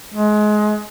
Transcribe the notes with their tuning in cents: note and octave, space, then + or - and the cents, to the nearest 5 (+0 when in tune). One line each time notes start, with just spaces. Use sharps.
G#3 +25